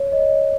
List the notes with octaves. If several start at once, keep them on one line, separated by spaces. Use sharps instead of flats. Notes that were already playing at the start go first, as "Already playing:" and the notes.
Already playing: C#5
D#5